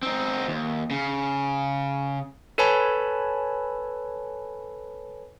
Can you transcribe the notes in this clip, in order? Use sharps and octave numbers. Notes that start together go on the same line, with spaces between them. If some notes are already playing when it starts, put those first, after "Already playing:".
C4 D#4
D#2
C#3
A4 B4 C#5 G#5 A5 B5